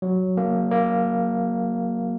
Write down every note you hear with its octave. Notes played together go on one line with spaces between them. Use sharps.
F#3
A#3
A#3